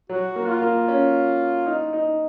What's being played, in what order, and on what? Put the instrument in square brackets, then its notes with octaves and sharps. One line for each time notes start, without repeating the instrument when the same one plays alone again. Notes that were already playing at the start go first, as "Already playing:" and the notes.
[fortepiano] F#3 [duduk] F#4
[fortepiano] A#3
[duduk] F4
[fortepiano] A#3
C#4
D#4
D#4